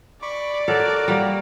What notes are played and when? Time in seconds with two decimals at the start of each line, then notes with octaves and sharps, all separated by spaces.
0.22 D5 B5 C#6 D6
0.68 F#4 A4 A#4 C#5
1.08 G3 A#3